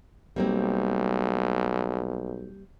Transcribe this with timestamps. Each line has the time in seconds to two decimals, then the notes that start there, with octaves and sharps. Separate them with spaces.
0.36 B1 G3 A#3 C4